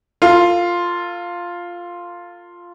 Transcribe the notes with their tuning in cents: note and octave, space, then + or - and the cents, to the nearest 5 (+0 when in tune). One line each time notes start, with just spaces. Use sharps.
F4 +0 A4 +45